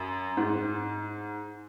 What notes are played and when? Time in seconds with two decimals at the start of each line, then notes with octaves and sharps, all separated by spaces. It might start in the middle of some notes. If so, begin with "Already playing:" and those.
Already playing: F#2
0.37 G#2